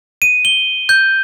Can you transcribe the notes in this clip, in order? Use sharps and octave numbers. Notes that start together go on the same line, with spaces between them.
D#7
G7
G6